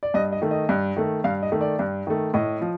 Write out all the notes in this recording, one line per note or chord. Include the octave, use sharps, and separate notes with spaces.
D5
G2 D#5
D#5
D#3 A3
D#5
G2
D#3 A3
G2 F5
D#5
D#3 A3
D5
G2
D#3 A3
A2 D#5
F3